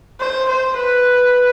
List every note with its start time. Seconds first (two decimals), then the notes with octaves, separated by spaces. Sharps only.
0.20 C5
0.49 C5
0.77 B4